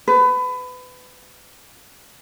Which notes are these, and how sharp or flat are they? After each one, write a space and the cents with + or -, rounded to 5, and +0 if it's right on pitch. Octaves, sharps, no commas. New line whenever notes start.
B4 +25